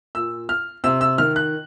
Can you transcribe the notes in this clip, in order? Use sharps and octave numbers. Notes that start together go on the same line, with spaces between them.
A#2 E6
F6
C3 E6
E6
D#3 F6
F#6